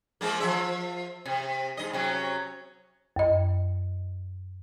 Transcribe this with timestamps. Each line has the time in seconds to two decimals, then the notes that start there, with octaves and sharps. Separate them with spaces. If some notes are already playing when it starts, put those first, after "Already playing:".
0.21 F3 G#3 A#3
0.40 F3 E5
1.26 C3
1.77 G#2 D#5
1.93 C3 F#3 C#4
3.16 F#2 D#5